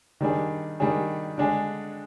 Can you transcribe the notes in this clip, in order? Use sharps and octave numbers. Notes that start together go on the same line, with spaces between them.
D#3 G3 D4 G#4
D#3 G3 D4 G#4
D3 G#3 D4 G#4